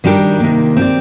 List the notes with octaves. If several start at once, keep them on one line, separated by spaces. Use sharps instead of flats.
D#3 G3 D4 G4 A#4
C3 D#3 A#3
C4 G4 D5